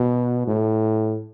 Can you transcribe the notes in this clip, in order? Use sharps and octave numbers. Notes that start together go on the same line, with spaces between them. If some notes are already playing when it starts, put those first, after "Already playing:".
Already playing: B2
A2